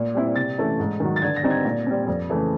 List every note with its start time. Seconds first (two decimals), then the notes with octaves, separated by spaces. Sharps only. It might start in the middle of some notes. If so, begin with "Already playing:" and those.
Already playing: A#2
0.14 G3 C4 E4
0.36 C3 A6
0.58 E3 A3 C#4 E4
0.80 G#2
1.00 D#3 F#3
1.16 A6
1.22 D3 G#6
1.36 A#6
1.43 G3 C4 D#4
1.51 G#6
1.65 A#2
1.87 G3 C4
2.07 F2
2.29 C#3 E3 A3